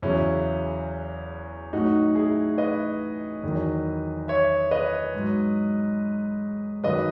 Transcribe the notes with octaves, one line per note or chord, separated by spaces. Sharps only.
E2 C#3 F#3 C#4 E4
A2 F#3 D#4 F#4
E4 G#4
B4 D#5
E2 D#3 F#3
C#5 E5
B4 D#5
G#2 F#3
F#2 D#3 F#3 B4 D#5